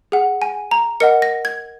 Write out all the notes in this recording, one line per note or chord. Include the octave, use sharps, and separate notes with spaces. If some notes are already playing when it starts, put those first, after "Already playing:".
G#4 F#5
G#5
A#5
A#4 D#5 F#5 C#7
A#6
G#6